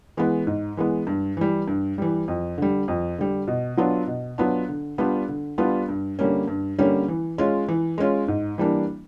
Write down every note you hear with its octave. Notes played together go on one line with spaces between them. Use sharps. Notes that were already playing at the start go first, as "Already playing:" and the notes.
E3 G#3 B3
G#2
E3 G#3 B3
G2
E3 G3
G2
E3 G3
F2
D3 G3
F2
D3 G3
B2
F#3 B3 D4 F4
B2
F#3 B3 D4 F4
D3
G3 B3 D4 F4
D3
G3 B3 D4 F4
G2
D3 G3 A#3 C#4
G2
D3 G3 A#3 C#4
E3
G#3 C#4 F4
E3
G#3 C#4 F4
G#2
E3 G3 A#3 D4